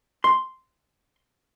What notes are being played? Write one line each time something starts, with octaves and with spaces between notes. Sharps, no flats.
C6